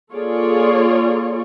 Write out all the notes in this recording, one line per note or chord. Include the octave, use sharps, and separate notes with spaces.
A#3 F4 G#4 A4 C#5 D5